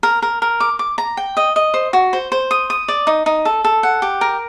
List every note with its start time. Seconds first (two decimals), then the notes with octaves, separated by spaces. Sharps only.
0.03 A#4
0.22 A#4
0.42 A#4
0.60 D6
0.79 D6
0.98 A#5
1.17 G5
1.37 D#5
1.56 D#5
1.74 C5
1.93 F#4
2.13 C5
2.32 C5
2.51 D#6
2.70 D#6
2.88 D5
3.07 D#4
3.26 D#4
3.45 A4
3.64 A4
3.83 F#5
4.02 G4
4.21 A#4